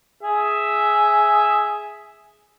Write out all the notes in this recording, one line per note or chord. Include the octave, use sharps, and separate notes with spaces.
G#4 E5